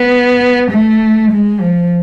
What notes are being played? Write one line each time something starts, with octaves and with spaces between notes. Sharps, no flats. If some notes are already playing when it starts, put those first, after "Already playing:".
Already playing: B3
A3
G#3
F3